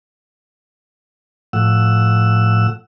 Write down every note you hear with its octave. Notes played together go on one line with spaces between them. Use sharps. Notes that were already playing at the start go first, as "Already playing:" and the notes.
A2 F3 F#5 E6